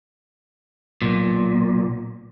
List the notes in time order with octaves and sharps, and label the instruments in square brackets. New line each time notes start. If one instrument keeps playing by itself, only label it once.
[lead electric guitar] B1 A#2